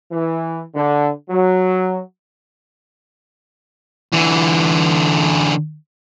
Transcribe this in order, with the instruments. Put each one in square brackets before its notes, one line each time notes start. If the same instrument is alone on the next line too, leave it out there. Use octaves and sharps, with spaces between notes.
[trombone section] E3
D3
F#3
[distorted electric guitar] D3 E3